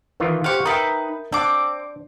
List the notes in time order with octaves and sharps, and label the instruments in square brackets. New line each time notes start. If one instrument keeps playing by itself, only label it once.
[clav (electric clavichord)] D#3 E3 F4
[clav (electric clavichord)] G4 C5 F#5 [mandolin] F5 C#6
[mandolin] D#4 B4 [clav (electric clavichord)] A#4 E5 G5
[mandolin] C4 D6 [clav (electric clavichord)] D4